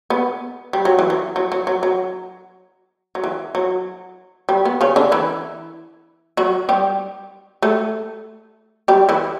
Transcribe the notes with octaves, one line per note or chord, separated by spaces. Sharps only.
B3
G3
F#3
E3
F#3
F#3
F#3
F#3
F#3
F#3
E3
F#3
G3
B3
C#3 C#4
D3 D4
E3 E4
F#3 F#4
G3 G4
A3 A4
G3 G4
E3 E4